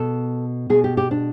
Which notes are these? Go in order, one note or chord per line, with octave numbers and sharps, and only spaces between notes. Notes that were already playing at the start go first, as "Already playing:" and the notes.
Already playing: B2 A4
B2 G#4
G4
G4
D4